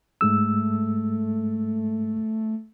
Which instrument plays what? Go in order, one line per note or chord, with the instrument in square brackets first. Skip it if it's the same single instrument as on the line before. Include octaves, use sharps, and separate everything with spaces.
[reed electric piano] G#2 G#3 E6 [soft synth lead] A3